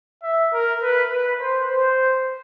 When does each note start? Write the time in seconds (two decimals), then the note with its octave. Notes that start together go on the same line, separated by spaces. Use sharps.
0.23 E5
0.53 A#4
0.83 B4
1.11 B4
1.41 C5
1.71 C5